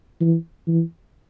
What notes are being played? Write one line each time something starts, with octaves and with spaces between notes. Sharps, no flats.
E3
E3